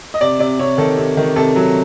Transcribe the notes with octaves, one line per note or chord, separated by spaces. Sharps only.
D#5
C3 D5
C3 D5
C3 C#5
D#3 A4
C3
D#3
C3 A4
F#3